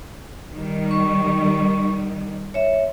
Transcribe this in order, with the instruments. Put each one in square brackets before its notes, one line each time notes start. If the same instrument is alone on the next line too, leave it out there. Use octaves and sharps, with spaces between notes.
[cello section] D#3 G3
[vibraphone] C#6
C#5 E5